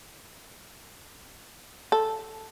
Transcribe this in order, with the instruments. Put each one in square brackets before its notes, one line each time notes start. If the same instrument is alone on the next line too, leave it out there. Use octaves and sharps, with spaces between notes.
[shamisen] A4